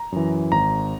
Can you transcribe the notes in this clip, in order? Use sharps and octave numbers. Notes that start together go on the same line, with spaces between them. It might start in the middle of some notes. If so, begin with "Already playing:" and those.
Already playing: A#5
F#2 E3
G#1 A#5